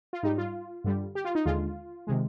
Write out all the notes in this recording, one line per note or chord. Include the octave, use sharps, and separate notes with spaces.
F4
G#2 G3 D#4
F4
G2 D3 G3
G4
F4
D#4
D#2 D3 G#3 F4
C3 D#3 G#3